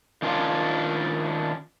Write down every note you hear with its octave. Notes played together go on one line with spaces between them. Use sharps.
D#3 C#4 D4 F4